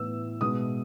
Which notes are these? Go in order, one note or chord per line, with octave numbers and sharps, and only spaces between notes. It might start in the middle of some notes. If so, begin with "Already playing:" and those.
Already playing: A2 E3 B3 E6
B2 G#3 B3 D#6